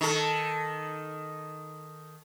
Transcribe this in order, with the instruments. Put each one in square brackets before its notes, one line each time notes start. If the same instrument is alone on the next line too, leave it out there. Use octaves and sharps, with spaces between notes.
[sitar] D#3 A4